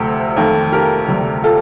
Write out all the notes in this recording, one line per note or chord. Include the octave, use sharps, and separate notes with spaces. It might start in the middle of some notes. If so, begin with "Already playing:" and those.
Already playing: D2 C3 F3 A3 G4
F2 D#3 A3
G4 A#4
D2 C3 G3
F4 A4